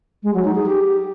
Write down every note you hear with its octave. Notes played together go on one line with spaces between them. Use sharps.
G#3
F#3
D#4
G#4
G4